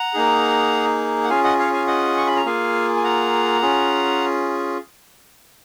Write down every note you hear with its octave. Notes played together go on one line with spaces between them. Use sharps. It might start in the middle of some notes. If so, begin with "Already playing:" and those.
Already playing: F#5 A#5
A#3 D#4 G#4
F#5
C#4 F4 G#4 F5 G#5
D#5 F#5
C#5 F5
F5 G#5
D#5 F#5
C#6
B5
A#5
A#3 F4 G#4 F5 G#5
G#5
F#5 A#5
C#4 F4 G#4